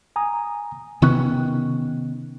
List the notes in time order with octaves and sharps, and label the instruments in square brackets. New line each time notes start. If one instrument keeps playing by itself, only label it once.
[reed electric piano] G#5 A#5 D#6
[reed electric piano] C3 C#6 F#6 [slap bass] D#3 B3 C#4